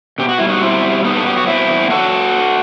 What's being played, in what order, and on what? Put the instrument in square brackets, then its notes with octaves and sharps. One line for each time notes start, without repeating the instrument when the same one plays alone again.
[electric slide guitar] B2 G4
F#4
G3 E4
D#4 F#4
B2 C4 E4
G3
B2 B3 D#4
A4
F#3 G4
F#4
B2 C4 E4
E2
F#3 F#4 A4